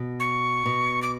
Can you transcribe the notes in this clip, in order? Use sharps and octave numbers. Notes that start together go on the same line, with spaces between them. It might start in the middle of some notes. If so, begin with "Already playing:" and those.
Already playing: B2
C#6
B2
D6